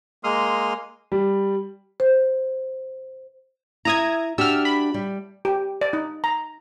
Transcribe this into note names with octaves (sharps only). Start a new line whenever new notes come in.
G#3 A#3 C6 D#6 F6
G3
C5
E4 E5 A#5 D#6 G#6
D4 F#4 G4 E6 F6
B5
G3
G4
D5
D#4
A#5